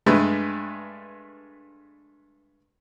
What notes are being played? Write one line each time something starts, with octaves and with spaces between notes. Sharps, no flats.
G2 G#3 A3 B4